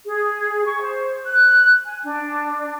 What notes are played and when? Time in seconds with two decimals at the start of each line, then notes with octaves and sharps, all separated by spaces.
0.05 G#4
0.65 C#6
0.82 C5
1.25 F#6
1.85 G#5
2.04 D4